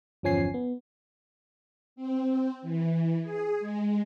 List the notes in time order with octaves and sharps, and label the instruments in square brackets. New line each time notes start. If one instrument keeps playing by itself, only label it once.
[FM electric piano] G1 E2 F3 C#4 G#5 C7
B3
[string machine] C4
E3
G#4
G#3